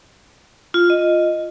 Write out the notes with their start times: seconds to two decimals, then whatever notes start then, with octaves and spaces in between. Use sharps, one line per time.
0.74 F4
0.90 D#5